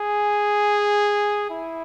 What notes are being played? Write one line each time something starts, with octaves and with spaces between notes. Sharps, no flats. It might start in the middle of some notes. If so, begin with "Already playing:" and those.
Already playing: G#4
E4